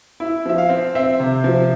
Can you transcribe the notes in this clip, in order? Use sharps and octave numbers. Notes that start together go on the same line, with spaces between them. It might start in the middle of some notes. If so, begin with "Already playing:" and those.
E4
F3 E5
F5
C4
C4 E5
C3
F3